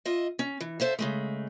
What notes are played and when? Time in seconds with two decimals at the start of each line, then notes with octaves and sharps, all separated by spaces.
0.05 F4 D#5 E5
0.39 C#4
0.61 E3
0.80 A4 C5 E5 F5
0.99 C#3 G#3 A3